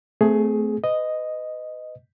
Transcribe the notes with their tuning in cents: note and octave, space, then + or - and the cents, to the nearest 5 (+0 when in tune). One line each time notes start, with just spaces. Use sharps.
A3 +0 C4 -25 G#4 +15
B4 +35 D#5 +0